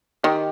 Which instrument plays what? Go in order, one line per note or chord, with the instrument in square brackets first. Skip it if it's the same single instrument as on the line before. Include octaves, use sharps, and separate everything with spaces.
[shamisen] D#3 [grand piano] G4